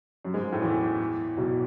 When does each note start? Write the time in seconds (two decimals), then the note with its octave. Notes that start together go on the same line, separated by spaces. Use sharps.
0.25 F#2 F#3
0.34 G#2 G#3
0.52 A2 A3
0.62 E2 E3
1.37 B1 B2